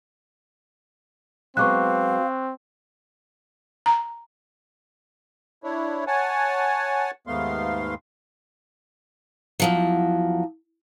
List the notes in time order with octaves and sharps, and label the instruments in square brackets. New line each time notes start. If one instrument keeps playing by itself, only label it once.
[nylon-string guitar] F#3 G#3 B3 [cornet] C4 [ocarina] F5 [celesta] C#6 D6 F#6
[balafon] A#5
[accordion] D4 E4 C#5
C#5 F#5 G#5 A5
D#2 G#2 A3 B3 F5 C6
[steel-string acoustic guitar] E2 F3 F#3